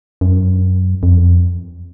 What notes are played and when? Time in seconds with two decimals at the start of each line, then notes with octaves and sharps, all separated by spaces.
0.21 F#2
1.03 F2